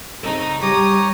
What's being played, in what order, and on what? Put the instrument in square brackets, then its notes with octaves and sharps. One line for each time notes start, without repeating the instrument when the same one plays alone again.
[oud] C#3 C4 A4 [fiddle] D#4
[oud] G3 [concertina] G4 C#5 A#5 [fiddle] D#6